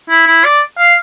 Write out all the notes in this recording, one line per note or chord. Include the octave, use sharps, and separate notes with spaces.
E4
E4
D5
F5